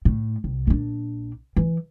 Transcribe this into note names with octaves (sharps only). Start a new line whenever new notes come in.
A2
C2
A#1 D4
E3